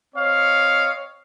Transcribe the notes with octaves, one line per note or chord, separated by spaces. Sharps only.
C4 C#5 D#5 F5